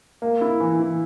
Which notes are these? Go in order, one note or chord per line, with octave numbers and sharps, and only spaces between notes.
A#3
E4
E3
E3